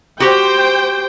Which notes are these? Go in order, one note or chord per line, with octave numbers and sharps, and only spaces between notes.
F#4 G4 C5 G5